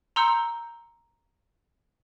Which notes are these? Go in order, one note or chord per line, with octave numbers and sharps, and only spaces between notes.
A#5 C6 E6 G6 C#7